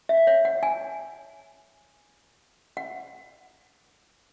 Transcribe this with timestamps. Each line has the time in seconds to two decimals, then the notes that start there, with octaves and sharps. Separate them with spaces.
0.09 E5
0.27 C#5
0.45 F#5
0.63 G#5
2.77 F#5